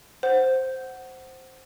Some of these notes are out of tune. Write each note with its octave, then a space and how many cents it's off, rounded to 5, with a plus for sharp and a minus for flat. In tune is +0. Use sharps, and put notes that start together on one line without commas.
C5 +0 F#5 +10